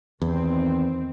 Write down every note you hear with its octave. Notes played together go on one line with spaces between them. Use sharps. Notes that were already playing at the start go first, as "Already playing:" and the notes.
E2 D#3 C4